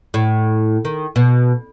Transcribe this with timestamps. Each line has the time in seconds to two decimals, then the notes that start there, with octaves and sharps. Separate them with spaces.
0.14 A2
0.85 D#3
1.16 B2